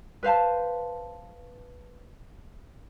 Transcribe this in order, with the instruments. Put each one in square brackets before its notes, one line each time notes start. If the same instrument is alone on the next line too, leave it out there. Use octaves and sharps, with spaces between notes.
[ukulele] B4 C5 F5 A5